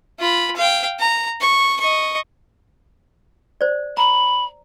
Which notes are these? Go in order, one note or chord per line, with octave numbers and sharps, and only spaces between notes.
F4 B5
F5 G5
A#5
C#6
D#5 C#6
C5 D5
A#5 B5